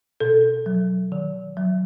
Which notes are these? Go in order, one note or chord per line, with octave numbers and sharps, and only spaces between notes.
B2 A4
F#3
D#3
F#3